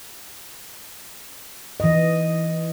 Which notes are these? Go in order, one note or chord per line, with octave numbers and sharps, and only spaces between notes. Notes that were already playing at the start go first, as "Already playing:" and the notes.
E3 D#5